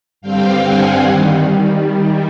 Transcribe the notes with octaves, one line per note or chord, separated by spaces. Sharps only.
G2 D3 G3 C4 F5 G5
F#5 G#5
D#3 G3